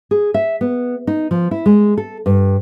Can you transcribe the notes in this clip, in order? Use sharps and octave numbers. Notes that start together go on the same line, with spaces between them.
G#4
E5
B3
D#4
F3
E4
G#3
A4
G2